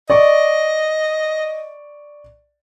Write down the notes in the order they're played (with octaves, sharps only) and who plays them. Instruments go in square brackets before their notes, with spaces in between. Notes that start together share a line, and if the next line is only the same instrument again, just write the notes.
[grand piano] D5 C#6 [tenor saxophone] D#5